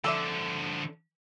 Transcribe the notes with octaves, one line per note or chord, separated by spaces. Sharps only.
D3 F3 A4 D5 E5